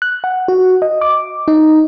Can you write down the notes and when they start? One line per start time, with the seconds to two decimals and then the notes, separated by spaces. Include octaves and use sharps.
0.02 F#6
0.24 F#5
0.48 F#4
0.82 D#5
1.01 D6
1.48 D#4